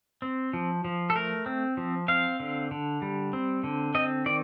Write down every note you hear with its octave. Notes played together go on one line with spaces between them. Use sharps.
C4
F3
F3
A4
A3 A#4
C4
F3
C4 F5
D3
D3
G3
C4
D3
C4 D#5
D#3 D5